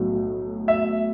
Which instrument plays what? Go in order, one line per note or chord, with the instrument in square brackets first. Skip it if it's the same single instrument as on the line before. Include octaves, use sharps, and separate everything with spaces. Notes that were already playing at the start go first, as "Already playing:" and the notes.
Already playing: [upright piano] B1 A2 F#3
[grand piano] E5